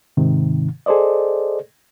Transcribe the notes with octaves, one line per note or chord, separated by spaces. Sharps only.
G#2 C3 D#3
G#4 A4 C5 D5 D#5